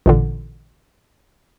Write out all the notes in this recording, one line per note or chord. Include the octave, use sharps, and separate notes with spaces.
A1 A#2 D3